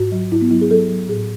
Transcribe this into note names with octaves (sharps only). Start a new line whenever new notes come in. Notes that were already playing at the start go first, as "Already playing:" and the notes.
Already playing: G#2 F#4
F#3
G#2 E4
B3
F#3 E4
G#4
F#3 A4
F#3
A2 G#4